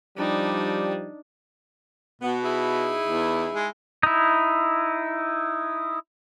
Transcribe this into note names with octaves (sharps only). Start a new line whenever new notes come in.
F3 G3 D4 D#4
B2 B3
D#4 E4 G#4
E2
G#3
D#4 E4